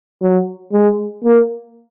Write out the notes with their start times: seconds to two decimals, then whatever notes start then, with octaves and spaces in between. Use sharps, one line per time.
0.22 F#3
0.73 G#3
1.24 A#3